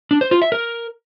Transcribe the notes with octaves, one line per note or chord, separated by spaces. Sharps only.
D4
C5
F4
E5
A#4